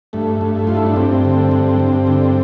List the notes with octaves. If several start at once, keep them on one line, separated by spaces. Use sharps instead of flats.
G2 A3
G2
G2 F4
E4
D4
G2 C4
D3
G2
G2
D3